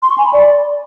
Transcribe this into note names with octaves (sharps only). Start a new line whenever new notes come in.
C6
C#6
G#5
B5
D5